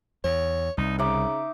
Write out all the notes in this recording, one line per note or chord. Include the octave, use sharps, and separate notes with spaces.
E2 C#5
C2 D#4
C#3 D#4 E5 D6